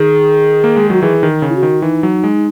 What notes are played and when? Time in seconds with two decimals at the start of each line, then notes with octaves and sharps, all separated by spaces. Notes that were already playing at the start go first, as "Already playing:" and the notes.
Already playing: D#3 G#4
0.64 A#3
0.76 G#3
0.90 F#3 F#4
1.02 E3 G#4
1.23 D#3
1.42 C#3
1.49 E4
1.56 F#4
1.63 D#3
1.82 E3 D#4
2.03 F#3
2.24 G#3